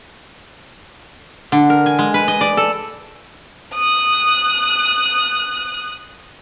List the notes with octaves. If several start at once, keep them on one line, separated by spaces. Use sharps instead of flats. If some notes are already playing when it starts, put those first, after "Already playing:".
D3
A#4
G#5
G#3
B4
D#5
D5
A4
D#6 F#6